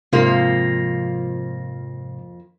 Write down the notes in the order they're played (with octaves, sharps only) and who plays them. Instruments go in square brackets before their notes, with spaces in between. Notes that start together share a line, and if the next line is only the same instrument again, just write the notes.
[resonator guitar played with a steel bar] F2 F3 A#3 [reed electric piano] G#2 C3